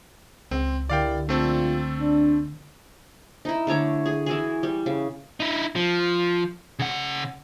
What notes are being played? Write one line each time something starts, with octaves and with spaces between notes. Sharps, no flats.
C#2 C4
D3 E4 G4 A#4 D5 F5 G5
A#1 A3 C4 D4 F4 A4
D4
D#4 E4
D3 A3 C#5 D6
G#4
E3 E4 F#4 G#4
G3
C#3
D#4 E4
F3
C#3 F#5